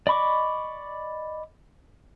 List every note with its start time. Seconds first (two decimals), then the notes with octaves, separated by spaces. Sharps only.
0.07 D5 D#5 B5 C#6 D6